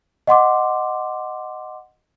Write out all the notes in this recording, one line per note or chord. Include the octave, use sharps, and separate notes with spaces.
D#5 F#5 C6 D6